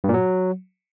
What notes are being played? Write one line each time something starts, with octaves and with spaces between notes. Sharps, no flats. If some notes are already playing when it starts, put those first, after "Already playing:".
G2
A#2
F#3